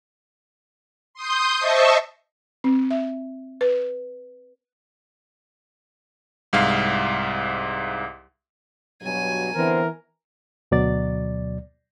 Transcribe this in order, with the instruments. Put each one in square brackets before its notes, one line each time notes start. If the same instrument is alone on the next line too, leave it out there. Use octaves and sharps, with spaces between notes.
[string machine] C6 D#6 G6
C5 D#5 E5 A5 C#6
[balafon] C4
E5
B4
[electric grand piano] C2 G#2 F5
[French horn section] G2 B2 F#3 [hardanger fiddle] G#5
[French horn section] D3 B3 C4 [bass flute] E3 [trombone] A#4
[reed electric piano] D2 B2 F#3 D5 A6